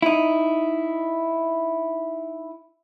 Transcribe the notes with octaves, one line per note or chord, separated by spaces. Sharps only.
D#4 E4